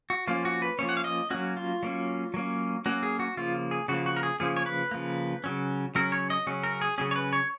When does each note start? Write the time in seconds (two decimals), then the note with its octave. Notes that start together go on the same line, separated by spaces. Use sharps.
0.10 F#4
0.27 F3 A#3 C#4 F4
0.45 F#4
0.62 B4
0.79 F3 A#3 C#4 C#5
0.89 F#5
0.97 F5
1.04 D#5
1.30 F#3 A#3 C#4 F#4
1.57 F4
1.83 F#3 A#3 C#4
2.34 F#3 A#3 C#4
2.86 F#3 A#3 C#4 F#4
3.03 G#4
3.19 F#4
3.37 C#3 F3 A#3 F4
3.71 G#4
3.88 C#3 F3 A#3 F#4
4.06 F#4
4.17 A#4
4.23 G#4
4.40 C#3 F3 A#3 G#4
4.57 C#5
4.66 B4
4.91 C#3 F3 A#3
5.44 C#3 F#3 C#4
5.95 C#3 F#3 C#4 A#4
6.12 C#5
6.30 D#5
6.47 C#3 F#3 C#4
6.63 A#4
6.81 G#4
6.98 C#3 F#3 C#4 G#4
7.11 C#5
7.16 B4
7.33 C#5